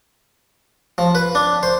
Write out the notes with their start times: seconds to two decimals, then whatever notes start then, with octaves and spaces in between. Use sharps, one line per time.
0.98 F3
1.15 B4
1.35 D4
1.63 C5